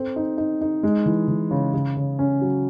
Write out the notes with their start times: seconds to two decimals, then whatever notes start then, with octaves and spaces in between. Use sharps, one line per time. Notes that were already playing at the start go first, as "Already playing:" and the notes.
Already playing: C4 A4
0.16 D#4
0.38 D#4
0.61 D#4
0.83 G#3
1.06 E3
1.28 E3
1.51 C#3
1.74 C#3
1.97 C#3
2.19 C#4
2.41 F#3